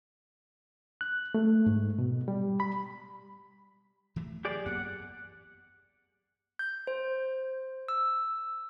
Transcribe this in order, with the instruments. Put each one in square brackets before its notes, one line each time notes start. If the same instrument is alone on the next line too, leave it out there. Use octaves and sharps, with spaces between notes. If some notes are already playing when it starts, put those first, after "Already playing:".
[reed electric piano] F#6
A3
G#2
B2
G3
B5
[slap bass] E3 F#3 A3
[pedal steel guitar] G4 G#4 D5
[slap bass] F#2 A#3 B3 [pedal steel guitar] F#5
[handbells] G6
C5
E6